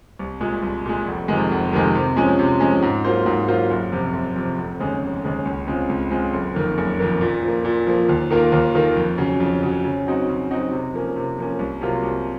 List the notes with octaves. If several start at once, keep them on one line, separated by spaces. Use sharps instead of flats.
C2
A#2 G#3
C2
A#2 G#3
F1
F2 C3 D#3 G#3
F1
F2 C3 D#3 G#3
C3
F3 G#3 C#4
C3
F3 G#3 C#4
G#2
F#3 A#3 F4 C5
G#2
F#3 A#3 F4 C5
F#1
F2 C3
F#1
F2 C3
F1
D#2 C#3 G#3
F1
D#2 C#3 G#3
C#2
C#3 G#3 C4 F4
C#2
C#3 G#3 C4 F4
F#1
F2 D#3 A#3
F#1
F2 D#3 A#3
A#2
F3
A#3
A#2
F3 A#3
D#2
D#3 A#3 F4 A#4
D#2
D#3 A#3 F4 A#4
F2
C#3 F#3
F2
C#3 F#3
C#3
F#3 C4 D#4 F#4
C#3
F#3 C4 D#4 F#4
C3
F3 A#3 C#4
C3
F3 A#3 C#4
C2
C3 F#3 A#3 F4
C2